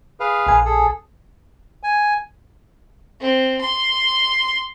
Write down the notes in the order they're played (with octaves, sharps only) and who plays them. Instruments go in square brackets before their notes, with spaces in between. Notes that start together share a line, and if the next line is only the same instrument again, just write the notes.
[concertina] G#4 B4 F5
[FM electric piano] A#1 G#5
[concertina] G#4 A4
[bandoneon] G#5
[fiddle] C4
C6